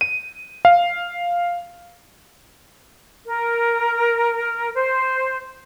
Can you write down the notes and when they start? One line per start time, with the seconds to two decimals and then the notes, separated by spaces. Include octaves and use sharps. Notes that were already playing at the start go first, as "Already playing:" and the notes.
0.01 D#7
0.65 F5
3.27 A#4
4.74 C5